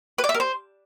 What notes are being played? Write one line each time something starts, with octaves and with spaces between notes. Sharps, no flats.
B4
D5
E5
A#4
C5